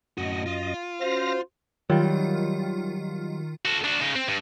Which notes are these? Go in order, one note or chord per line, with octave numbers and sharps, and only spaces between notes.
F#2 A2 F#4 D#5
F4
C#4 F#4 C5 F5 A#6
D#3 F#3 G3 F4
F#4 A4
D4 F#4
C#3 D#4
C4
G2